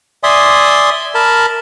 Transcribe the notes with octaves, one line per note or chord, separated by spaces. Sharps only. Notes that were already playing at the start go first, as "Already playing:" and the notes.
D5 E5 G#5 C6 D#6
A#4 A5 B5